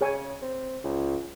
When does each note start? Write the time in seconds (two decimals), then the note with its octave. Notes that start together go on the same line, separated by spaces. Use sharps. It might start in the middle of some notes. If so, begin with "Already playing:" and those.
0.01 C#3 G#4 C#5 G#5
0.42 C4
0.84 C#2